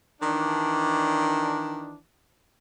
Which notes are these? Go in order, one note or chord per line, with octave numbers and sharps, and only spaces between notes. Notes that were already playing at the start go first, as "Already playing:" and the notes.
D#3 E3 D4